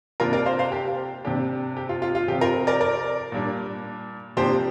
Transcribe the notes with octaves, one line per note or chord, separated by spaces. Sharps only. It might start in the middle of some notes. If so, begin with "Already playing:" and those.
C3 A#3 D4 F4 A#4
A#4 D5
C5 F5
C5 F5
G4
C3 A#3 D4 G4
G4
F4
F4
F4
C3 F3 C4 G4
F4 A#4
A#4 D5
A#4 D5
A#2 G3 A#3 D4
C3 F3 A#3 D4 G4 C5